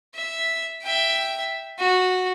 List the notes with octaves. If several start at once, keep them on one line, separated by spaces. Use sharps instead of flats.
E5
E5 G5
F#4